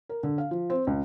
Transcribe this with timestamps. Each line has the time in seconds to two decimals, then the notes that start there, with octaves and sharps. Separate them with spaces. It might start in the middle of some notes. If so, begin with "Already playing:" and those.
0.09 A#4
0.23 D3
0.38 F5
0.51 F3
0.70 C4
0.87 C#2